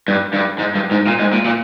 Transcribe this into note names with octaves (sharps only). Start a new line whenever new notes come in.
G2
G2
G#2
G2
G#2
A#2
G#2
A#2
A#2